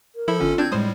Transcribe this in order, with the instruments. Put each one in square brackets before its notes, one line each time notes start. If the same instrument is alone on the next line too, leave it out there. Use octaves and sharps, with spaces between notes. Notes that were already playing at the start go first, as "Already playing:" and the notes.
[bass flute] A#4
[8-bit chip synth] F3 A4 B5 [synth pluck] E4
[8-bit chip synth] G1 C#4 A4 [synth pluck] D3 [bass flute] F4
[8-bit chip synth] C4 G6 G#6 [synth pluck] D4
[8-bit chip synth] A2 G3 [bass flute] G#3 [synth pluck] C5 D#6